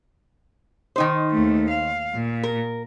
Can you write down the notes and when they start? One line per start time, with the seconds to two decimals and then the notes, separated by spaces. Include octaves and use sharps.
0.96 D#3 D#4 C5
1.31 D#2 A3
1.70 F5
2.15 A#2
2.43 A#4